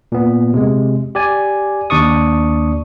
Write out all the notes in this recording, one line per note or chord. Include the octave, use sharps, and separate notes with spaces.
A#2 B3
C3 G#3
G4 D5 G#5
D#2 D4 D5 C#6 D#6